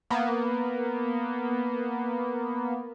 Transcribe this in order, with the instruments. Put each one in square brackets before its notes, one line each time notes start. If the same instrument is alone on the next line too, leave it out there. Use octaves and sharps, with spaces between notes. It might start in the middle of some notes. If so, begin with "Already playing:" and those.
[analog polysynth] A#3 B3